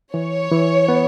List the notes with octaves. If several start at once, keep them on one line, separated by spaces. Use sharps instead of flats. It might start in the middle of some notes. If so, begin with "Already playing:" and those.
E3 C#5
E3
B3